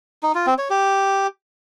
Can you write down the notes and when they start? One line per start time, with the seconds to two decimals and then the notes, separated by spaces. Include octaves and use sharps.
0.23 D#4
0.35 F4
0.47 C4
0.58 C#5
0.70 G4